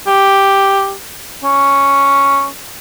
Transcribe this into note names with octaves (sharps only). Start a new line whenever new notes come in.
G4
C#4